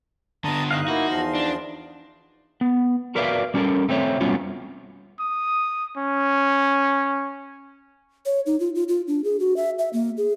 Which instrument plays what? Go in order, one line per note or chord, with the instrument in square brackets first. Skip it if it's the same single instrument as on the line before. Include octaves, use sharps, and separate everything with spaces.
[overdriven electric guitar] D3 B3 [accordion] A5 A#5 D#6
[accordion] G2 F#6 [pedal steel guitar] D#4 D#5 F5
[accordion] A#3 E4 [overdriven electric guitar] F#4
[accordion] E2 F3 C6
[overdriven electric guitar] D4
[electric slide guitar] B3
F#4 A#4 B4 D5 E5 F5
G3 C#4 E4 G4 A4 A#4
A3 C4 C5 C#5 E5
G3 B3 C#4 F4 F#4
[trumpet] D#6
C#4
[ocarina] C#5
D#4
F4
F4
F4
D4
G#4
F#4
E5
E5
A#3
G#4